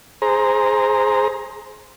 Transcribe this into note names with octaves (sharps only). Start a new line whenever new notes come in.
G#4 C5 A#5